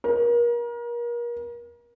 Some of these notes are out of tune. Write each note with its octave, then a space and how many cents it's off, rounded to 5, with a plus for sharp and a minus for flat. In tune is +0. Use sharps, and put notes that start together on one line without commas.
A#4 +35